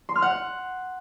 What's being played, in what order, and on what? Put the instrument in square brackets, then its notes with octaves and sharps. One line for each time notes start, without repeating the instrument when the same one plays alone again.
[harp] C6
F6
F#5